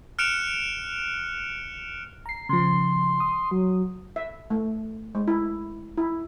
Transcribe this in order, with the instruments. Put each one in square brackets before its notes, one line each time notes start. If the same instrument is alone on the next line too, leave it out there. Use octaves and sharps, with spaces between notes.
[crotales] F6 F#6 C#7 D7 E7 F7
[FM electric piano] A#5 C7
[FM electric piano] C#3 F3 [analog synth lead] C6
[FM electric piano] D#6
[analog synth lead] F#3
[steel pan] E5
A3
G#3
E4
E4